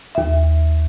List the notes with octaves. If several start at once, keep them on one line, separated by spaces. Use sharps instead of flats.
D#2 E5